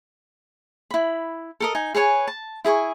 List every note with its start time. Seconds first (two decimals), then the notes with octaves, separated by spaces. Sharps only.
0.91 E4 B5
1.60 A4 A#4 D#5
1.75 D#4 G#5
1.95 G#4 B4 C#5 G#5
2.27 A5
2.65 E4 G#4 G#5 C#6